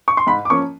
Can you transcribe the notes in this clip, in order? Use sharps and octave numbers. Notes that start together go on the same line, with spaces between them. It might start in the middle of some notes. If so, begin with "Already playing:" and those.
C#6
C6
G#2 B5
D6
F3 A#3 C#4 C#6